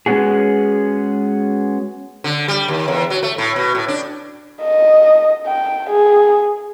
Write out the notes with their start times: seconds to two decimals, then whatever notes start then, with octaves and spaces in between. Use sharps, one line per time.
0.06 G#3 B3 C#4 F#4 G#4
2.24 D3
2.48 G3
2.68 D#2
2.88 E2
3.10 F#3
3.23 A3
3.38 A2
3.56 B2
3.75 A2
3.88 D4
4.63 D#5
5.46 G5
5.90 G#4